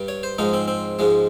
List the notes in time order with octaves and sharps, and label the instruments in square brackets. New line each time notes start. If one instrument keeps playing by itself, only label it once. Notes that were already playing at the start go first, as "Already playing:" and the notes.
Already playing: [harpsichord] G2 G3
C#5
C5
G#2 F3 G#3 D#4
C4
C4
G#2 F3 G#3